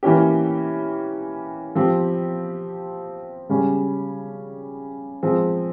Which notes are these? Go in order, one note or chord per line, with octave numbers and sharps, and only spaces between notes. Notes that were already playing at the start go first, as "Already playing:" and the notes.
E3 A#3 C#4 G4
F3 C4 G4
C#3 G3 C#4
F3 G#3 C4